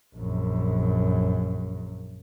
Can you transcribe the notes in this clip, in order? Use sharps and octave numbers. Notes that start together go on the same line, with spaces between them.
A#1 F#2